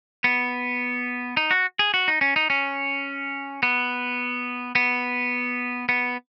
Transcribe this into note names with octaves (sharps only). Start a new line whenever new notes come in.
B3
D#4
F#4
G#4
F#4
D#4
C#4
D#4
C#4
B3
B3
B3